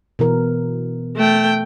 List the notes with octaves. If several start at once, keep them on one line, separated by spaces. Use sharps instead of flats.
B2 E3 A#4
A3 G5